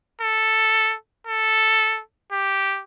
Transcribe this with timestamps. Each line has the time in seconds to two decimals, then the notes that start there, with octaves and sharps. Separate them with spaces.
0.21 A4
1.27 A4
2.32 G4